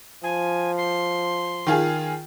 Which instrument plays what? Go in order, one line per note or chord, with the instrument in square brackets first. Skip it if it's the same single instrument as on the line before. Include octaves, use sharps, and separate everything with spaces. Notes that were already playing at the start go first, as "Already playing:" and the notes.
[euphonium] F3 [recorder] G#5
[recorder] C6
[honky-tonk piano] D#3 F4 G#4